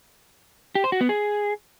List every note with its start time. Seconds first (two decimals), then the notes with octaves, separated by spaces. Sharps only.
0.75 G4
0.84 C5
0.92 F#4
1.01 B3
1.09 G#4